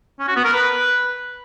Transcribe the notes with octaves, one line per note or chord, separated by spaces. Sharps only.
C#4
F#4
B3
A#4
B4